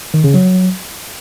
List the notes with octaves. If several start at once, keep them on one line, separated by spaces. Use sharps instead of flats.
D#3
C#3
F#3